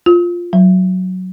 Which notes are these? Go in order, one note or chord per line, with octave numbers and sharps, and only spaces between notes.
F4
F#3